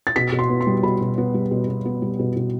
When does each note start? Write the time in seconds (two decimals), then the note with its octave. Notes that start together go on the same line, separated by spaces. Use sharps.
0.07 A6
0.16 B2 B6
0.32 B2
0.39 C6
0.50 B3
0.61 C6
0.67 G3
0.83 B2 B5
1.01 B2
1.18 B3
1.34 G3
1.51 B2
1.68 B2
1.85 B3
2.02 G3
2.19 B2
2.36 B2